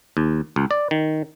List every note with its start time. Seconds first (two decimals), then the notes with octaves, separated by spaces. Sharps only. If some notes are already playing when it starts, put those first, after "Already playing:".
0.17 D#2
0.56 C#2
0.71 D5
0.91 D#3